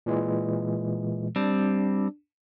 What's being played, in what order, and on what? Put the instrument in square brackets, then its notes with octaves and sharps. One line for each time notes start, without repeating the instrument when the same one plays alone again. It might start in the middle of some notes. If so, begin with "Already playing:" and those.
[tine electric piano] A#2 E3 G#3
[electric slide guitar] G3 C4 [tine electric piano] D4